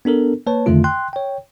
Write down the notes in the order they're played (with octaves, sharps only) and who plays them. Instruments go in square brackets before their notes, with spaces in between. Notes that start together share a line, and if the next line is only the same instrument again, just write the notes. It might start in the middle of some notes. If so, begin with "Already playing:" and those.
[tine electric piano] B3 D4 A4 A#4
A#3 B4 C#5 A5
F2 D3 D#3 A3 F4
G5 C6 F#6
C#5 G5